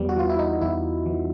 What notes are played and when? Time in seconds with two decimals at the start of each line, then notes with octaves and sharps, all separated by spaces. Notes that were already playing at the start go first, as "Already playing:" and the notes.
Already playing: E2 G3 B3
0.09 F#4
0.16 E3 F4
0.29 E4
0.39 D#4
0.61 E2 E4
1.06 E3